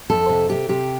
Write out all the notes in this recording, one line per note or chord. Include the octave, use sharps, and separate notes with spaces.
F2 A4
C3
C3 G4
C3 G4